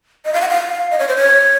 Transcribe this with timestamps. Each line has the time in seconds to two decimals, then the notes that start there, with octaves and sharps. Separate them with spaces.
0.25 D#5
0.34 F5
0.41 F#5
0.49 F5
0.91 D#5
0.99 C#5
1.08 C5
1.17 C#5